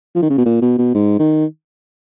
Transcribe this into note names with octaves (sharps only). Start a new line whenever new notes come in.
F3
D#3
C#3
B2
A#2
B2
B2
G#2
D#3